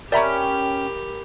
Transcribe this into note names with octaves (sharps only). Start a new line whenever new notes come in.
C#4 G4 A#4 D5 E5 G5 A#5 B5